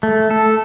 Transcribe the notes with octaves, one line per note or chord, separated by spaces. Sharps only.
A3
A4